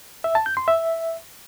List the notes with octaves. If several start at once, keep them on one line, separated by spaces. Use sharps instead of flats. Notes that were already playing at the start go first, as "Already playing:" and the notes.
E5
A5
G6
C6
E5